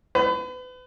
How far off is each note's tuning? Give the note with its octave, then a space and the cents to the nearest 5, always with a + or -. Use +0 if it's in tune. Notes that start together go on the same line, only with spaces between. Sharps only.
B4 +35